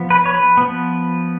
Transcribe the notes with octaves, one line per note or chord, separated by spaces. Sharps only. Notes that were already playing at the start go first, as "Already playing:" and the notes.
Already playing: F3 B3
B4
C#5
B4
F3 B3